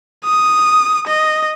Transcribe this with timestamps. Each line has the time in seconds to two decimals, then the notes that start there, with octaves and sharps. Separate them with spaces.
0.25 D#6
1.07 D#5